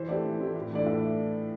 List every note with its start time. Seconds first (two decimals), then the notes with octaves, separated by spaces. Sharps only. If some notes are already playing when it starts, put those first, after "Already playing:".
Already playing: E3 C5
0.09 A3 C4 E4 G4 D5
0.25 E3
0.39 A3 C4 E4 G4
0.56 A2
0.71 E3 A3 D4 D5
0.86 A2 E5